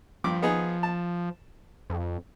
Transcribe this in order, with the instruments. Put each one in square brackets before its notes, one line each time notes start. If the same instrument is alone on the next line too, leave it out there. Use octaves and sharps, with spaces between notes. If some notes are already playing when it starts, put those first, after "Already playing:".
[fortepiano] G2 D6 [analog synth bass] F3
[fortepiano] B3 D#4 G#4
A5
[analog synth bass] F2